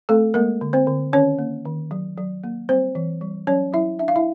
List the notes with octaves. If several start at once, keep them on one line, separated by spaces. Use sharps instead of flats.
A3 C4 A4
G#3 A#3 A#4
D3
C4 C5
D3
D#3 C#4 C#5
A#3
D#3
F#3
F#3
A#3
G3 C4 C5
E3
G3
F#3 C#4 C#5
F#3 E4 E5
D4 E5
F5
E4 E5